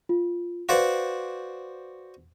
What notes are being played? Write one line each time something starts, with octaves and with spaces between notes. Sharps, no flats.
F4
F#4 B4 C5 D5 F5